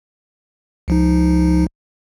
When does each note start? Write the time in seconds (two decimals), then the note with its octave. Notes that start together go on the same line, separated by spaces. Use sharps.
0.88 C#2 F3 D#4